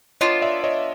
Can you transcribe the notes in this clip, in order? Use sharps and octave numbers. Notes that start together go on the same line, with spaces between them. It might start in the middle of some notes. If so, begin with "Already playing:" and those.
B3 D4 F4 C#5 D#5
D5 E5
C#5 D#5